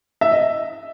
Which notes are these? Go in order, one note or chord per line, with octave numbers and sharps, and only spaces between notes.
E5
D#5